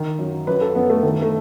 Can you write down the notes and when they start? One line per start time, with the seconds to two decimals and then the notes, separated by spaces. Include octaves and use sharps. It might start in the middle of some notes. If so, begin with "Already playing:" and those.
Already playing: D#3
0.19 F#2
0.47 F#2 B4
0.61 A4
0.75 F#2 B3
0.90 A3
1.03 D#3 A3
1.22 A3